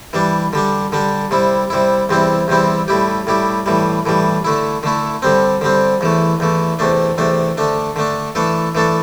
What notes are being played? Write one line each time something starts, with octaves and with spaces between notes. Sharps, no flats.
E3 G3 D4
D3 G3 D4
D3 G3 D4
C3 G3 E4
C3 G3 E4
E2 C3 G3 C4 E4
E2 C3 G3 C4 E4
A2 G3 E4 G4
A2 G3 E4 G4
A2 E3 G3
A2 E3 G3
D3 A3 E4
D3 A3 E4
D3 G3 C4
D3 G3 C4
E2 E3 A3
E2 E3 A3
E2 C3 A3 D4
E2 C3 A3 D4
D3 A3 D4
D3 A3 D4
E3 A3 D4 A4
E3 A3 D4 A4